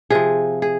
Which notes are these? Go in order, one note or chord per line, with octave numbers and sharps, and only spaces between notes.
C3 F3 G#4
G#4